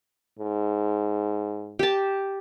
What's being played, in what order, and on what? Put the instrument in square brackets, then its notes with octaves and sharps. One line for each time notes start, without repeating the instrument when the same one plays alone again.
[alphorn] G#2
[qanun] G4 A5